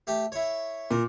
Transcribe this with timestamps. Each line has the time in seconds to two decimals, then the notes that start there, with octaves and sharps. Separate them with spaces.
0.07 A3 G4
0.32 E4 C#5
0.91 A#2 A#4